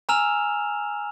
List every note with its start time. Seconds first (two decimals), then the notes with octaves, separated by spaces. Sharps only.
0.09 G#5 A#5 E6 F6 E7 F7